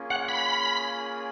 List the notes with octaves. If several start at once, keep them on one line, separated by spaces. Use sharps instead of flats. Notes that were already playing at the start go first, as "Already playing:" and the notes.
Already playing: A#3 C#4 F4 G#4
F#5
B5